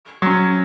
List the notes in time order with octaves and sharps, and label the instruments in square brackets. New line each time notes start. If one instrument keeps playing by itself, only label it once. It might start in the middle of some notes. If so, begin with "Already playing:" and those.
[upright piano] F#3 C#4